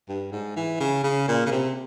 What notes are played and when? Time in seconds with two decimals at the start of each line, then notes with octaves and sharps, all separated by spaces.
0.09 G2
0.32 G#2
0.56 E3
0.80 C#3
1.03 C#3
1.28 A#2
1.46 C#3
1.51 C3